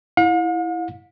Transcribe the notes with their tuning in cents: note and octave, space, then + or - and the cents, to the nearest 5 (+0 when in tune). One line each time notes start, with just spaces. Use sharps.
E4 +0 F5 +45